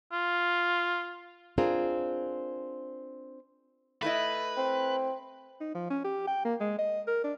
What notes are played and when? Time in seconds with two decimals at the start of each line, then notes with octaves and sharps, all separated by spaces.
0.12 F4
1.58 C4 D4 F4 G#4 A#4
4.02 A3 E4 B4 D#5
4.57 C4
5.61 D#4
5.75 F3
5.91 C#4
6.05 G4
6.28 G5
6.45 A#3
6.61 G#3
6.79 D#5
7.08 A#4
7.24 D4